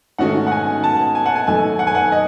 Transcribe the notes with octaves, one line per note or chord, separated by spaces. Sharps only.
G#2 D#3 A3 C#4 F#4 F#5
F#5
G#5
A5
G#5
F#5
G#5
F#2 D#3 A3 D#4 A4 G#5
F#5
G#5
F#5
D#5